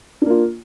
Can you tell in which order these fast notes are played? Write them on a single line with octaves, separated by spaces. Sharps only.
D4 A#3 F4